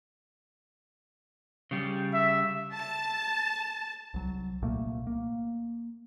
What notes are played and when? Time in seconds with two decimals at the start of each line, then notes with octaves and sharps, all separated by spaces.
1.71 C#3 G3
2.13 E5
2.72 A5
4.14 C2 F#3
4.62 C2 A#2 A3 A#3
5.07 A#3